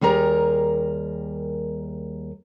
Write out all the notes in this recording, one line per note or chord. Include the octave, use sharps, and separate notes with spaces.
D#2 G3 G#4 A#4 A#5